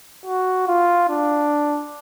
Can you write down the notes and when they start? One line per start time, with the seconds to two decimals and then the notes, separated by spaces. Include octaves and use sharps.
0.26 F#4
0.68 F4
1.09 D4